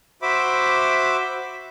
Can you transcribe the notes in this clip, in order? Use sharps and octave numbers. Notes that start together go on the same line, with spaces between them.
F#4 C5 E5 B5 D6